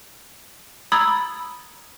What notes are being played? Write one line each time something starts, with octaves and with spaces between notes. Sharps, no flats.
A#5 B5 D#6 E6 G#6 A6